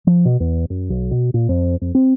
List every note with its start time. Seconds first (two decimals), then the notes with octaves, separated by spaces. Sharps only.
0.07 F3
0.25 B2
0.40 E2
0.70 F#2
0.90 B1
1.11 B2
1.34 A#2
1.49 F2
1.81 F2
1.95 C4